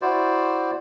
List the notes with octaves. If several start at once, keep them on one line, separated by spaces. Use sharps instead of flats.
E4 F#4 C5 D5